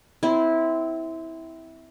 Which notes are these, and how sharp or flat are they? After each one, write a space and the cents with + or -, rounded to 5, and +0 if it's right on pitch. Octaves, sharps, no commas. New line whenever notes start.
C4 -25 E4 -15